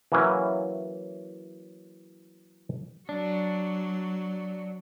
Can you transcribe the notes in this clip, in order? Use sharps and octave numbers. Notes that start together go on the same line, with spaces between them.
E3 F#3 A#3 C#4 E4
F#3 D4